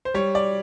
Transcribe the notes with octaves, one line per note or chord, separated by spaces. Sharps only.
C5
G3 C#5
D5